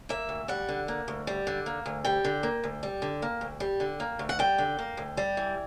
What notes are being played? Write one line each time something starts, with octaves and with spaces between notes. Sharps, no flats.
A#3 E5
D2
G3 F#5
D3
A#3
D2
G3
D3
A#3
D2
G3 G5
D3
A#3
D2
G3
D3
A#3
D2
G3
D3
A#3
D2
F#5
G3 G5
D3
A#3
D2
G3
E3